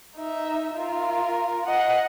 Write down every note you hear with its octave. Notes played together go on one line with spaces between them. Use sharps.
D#4 E5
F4 A#4
D#5 F#5